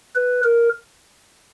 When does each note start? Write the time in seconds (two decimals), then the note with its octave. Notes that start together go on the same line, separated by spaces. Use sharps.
0.15 B4
0.43 A#4